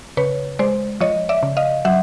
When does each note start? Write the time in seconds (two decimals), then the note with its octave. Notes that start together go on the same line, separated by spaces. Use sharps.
0.17 C#3 B4 C#5
0.59 G#3 C5 D5
1.00 F3 C#5 D#5
1.29 D5 E5
1.43 C#3
1.57 D#5 F5
1.85 F#3 E5 F#5